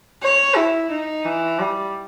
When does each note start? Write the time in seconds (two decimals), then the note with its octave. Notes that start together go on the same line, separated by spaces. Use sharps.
0.23 C#5
0.56 E4
0.91 D#4
1.25 E3
1.60 G3